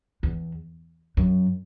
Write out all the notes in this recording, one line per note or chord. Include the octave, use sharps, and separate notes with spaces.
E2
F#2